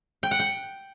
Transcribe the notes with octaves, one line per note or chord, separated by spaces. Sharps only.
G5
F#5
G5